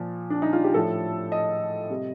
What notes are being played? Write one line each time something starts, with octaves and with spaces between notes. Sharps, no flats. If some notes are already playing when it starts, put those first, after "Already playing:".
Already playing: A#2 F3
D4
D#4
F4
G4
A2 F3 A4
D#5
C3 G3